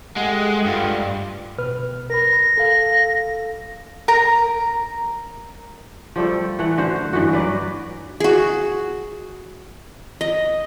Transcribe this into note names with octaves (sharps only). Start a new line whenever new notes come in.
G#3 A3 G4 F#5
G2 F4
B2 B4 F6
A#4 B5 A#6
A4 F5
A#4 A#5
F3 G3 A3 A4
E3 A3 F#5
D3 F#4 C5
G2 E3 D#4 F#4
F#3 B4 D5 D#5
F#4 G#4
D#5